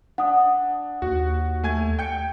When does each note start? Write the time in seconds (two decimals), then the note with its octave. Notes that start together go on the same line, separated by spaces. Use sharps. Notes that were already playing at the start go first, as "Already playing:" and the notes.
0.18 D4 F#5 D#6
1.02 D#2 F#4
1.64 A3 G#5 G#6
1.99 G5 G6 C#7